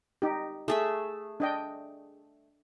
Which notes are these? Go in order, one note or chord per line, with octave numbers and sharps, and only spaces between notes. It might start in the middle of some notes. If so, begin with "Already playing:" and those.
D#4 G4
A3 G#4 E5
D4 D#5 G5